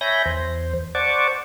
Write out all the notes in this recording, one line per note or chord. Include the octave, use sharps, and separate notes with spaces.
C#5 E5 G#5 B5 G6 A#6
E2 C5
C5 D5 F#5 A5 C#6 D6